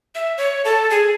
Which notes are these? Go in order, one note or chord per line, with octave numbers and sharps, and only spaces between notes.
E5
C#5
A4
G#4